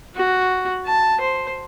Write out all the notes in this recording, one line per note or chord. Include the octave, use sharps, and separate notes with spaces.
F#4
A5
C5